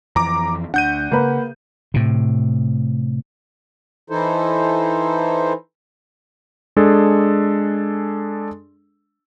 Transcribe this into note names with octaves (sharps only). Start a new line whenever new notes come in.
F2 E3 A#5 D6
D2 D4 F#5 G6 D#7
C#3 A#3 B4
A2 C3
E3 D#4 E4 A4 C5
G#3 D4 G#4 A4